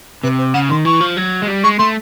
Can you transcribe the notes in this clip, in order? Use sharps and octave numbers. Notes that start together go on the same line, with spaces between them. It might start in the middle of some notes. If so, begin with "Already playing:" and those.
C3 B4
C5
C#3 F#5
D#3 C6
E3 C#6
F3
F#3
G#3
G3
G#3 C#6
A3 C6